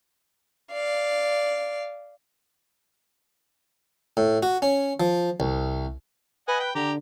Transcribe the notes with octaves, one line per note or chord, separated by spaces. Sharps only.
D5 F5
A2
F#4
C#4
F3
C2
B4 D#5 F#5 G#5
G5
D3 G4 A#5